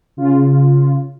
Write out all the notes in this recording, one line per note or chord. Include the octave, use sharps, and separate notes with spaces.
C#3 F4